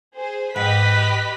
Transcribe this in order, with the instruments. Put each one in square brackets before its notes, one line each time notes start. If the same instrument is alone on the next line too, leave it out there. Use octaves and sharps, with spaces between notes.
[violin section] G#4 C5
[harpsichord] G#2 [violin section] G4 D#5 B6 [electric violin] B4